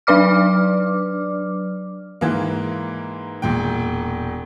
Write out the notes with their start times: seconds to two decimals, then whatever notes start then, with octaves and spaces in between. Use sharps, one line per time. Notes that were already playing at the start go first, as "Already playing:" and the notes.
0.07 F#3 D4 B4 D5 D6 F6
2.21 G#2 E3 A#3
3.42 E1 A#2 G5